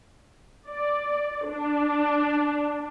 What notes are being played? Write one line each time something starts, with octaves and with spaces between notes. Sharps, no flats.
D5
D4